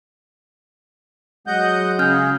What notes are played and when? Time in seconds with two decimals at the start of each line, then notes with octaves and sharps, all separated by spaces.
1.47 F#3 G#3 D#5 F#5 G6
1.99 C#3 C#4 G#4 F6 G6